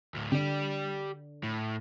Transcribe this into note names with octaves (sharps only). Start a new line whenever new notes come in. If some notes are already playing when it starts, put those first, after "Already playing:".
D2 A2
D3 G4 D5
A2